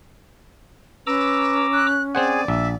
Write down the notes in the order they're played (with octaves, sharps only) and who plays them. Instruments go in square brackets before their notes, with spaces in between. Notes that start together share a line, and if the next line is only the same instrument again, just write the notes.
[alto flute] C#4 [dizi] B4 [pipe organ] A#5 D6 E6
[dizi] F#6
[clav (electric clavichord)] C4 C5 F#5 [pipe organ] G#4 G#5 [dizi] D5
[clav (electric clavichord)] A#1 [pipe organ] E5